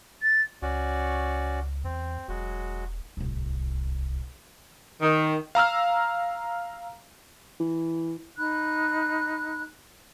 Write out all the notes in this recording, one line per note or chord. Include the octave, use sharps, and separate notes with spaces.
A6
C#2 C#4 F#4 D5
E2 C4
E1 F#3 G#3 F#4
D1 C2
D#3
F5 A#5 E6 F6
E3
D#4 B5 F#6